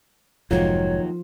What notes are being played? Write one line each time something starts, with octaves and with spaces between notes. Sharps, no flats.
F1 D#2 G#2 F3 F#3 A#3 F4 C#5